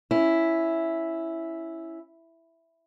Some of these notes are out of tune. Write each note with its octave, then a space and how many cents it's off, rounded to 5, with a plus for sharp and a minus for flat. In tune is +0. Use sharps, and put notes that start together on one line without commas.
C#4 +0 E4 +0